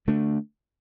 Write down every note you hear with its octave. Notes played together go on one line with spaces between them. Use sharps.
D3 A3 D4